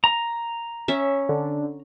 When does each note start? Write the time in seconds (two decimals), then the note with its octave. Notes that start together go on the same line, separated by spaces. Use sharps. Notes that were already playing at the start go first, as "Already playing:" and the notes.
0.04 A#5
0.88 C#4 E5
1.29 D3